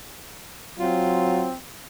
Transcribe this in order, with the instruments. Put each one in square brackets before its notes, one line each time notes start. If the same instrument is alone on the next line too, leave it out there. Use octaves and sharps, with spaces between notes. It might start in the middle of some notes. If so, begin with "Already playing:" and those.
[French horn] F#3 [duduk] C4 [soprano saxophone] F4